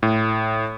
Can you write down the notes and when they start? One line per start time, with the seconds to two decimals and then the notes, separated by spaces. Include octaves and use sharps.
0.03 A2